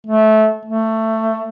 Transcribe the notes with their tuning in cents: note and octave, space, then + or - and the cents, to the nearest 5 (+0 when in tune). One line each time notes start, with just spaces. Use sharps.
A3 -20
A3 +15